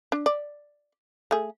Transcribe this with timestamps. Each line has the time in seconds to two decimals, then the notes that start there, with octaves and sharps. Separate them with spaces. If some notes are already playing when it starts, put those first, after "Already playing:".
0.12 D4
0.26 D5
1.31 A3 G#4